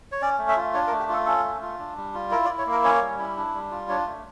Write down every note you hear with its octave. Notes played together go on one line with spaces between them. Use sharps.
C#5
C#4 D5
A3
E5
F4
D4 C#5
A#4
A3
G4
F4 A4
C#4 A4
A3
F4
D4
G3
F4
E4 A#4
D5
E4
C#5
A#3 A#4
C#4 C#5
G3
E4
D4
G3
F4
D4 C#5
A3